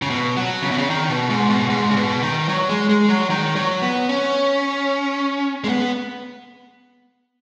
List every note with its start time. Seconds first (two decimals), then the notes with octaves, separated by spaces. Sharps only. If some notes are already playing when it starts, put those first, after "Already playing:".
0.02 C#3
0.10 B2
0.37 F#3
0.62 C#3
0.71 B2
0.78 C#3
0.90 D#3
1.09 B2
1.30 G#2
1.50 B2
1.70 G#2
1.91 C#3
1.96 B2
2.23 D#3
2.49 F#3
2.69 G#3
2.89 G#3
3.09 F#3
3.30 D#3
3.56 F#3
3.82 B3
4.09 C#4
5.64 G#3
5.68 B3